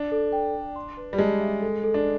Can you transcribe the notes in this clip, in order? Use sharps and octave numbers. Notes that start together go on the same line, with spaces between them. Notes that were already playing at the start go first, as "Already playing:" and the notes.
Already playing: D4
A4
G5
D5
C6
B4
G3
G#3 A5
E5
A4
A4
D4